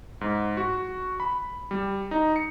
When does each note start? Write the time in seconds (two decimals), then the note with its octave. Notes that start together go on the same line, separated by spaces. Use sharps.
0.21 G#2
0.57 F#4
1.20 B5
1.71 G3
2.11 D#4
2.36 C#7